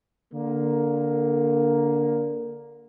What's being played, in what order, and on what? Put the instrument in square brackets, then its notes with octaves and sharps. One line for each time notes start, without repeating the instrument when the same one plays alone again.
[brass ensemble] D3 A#3